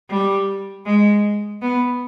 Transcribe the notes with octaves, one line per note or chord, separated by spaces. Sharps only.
G3
G#3
B3